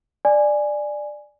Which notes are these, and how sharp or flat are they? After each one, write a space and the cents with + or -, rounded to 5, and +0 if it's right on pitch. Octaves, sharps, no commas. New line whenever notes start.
D5 +10 G#5 +0